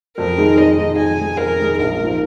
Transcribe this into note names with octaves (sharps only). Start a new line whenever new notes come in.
F2 A#4
D#3 G#3 D#4 G#4
F2 D#5
D#3 G#3 D#4 G#4
F2 G#5
D#3 G#3 D#4 G#4
F2 A#4
D#3 G#3 D#4 G#4
A#1 A#4
G#2 F3